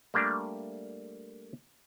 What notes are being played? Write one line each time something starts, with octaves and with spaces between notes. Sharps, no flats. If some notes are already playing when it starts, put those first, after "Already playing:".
G3 A3 A#3 D4